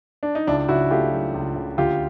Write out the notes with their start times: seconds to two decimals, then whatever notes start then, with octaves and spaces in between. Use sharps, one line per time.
0.23 D4
0.35 D#4
0.47 C#2 D4 E4
0.68 C#3 E4 F#4
0.91 A3 F4 G4
1.12 F#3
1.34 C#2
1.56 C#3
1.78 D2 F4 G4